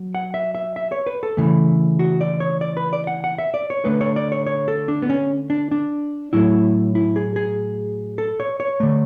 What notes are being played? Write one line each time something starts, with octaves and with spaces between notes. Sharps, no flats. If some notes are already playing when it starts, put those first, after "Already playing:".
Already playing: F#3
F#5
E5
E5
E5
C#5
B4
A4
C#3 E3 A3
F#4
D5
C#5
D5
B4
D5
F#5
F#5
E5
D5
C#5
D3 A3 B4
C#5
D5
C#5
C#5
A4
D4
B3
C#4
D4
D4
A2 F#3 A3 E4
E4
G#4
G#4
A4
C#5
C#5
D3 A3